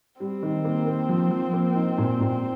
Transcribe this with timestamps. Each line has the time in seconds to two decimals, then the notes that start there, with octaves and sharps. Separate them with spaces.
0.20 G3 C4
0.43 D#3
0.64 A#3
0.87 A#3
1.09 F3
1.31 F3
1.53 A#3
1.75 D#4
1.98 A#2
2.21 A#2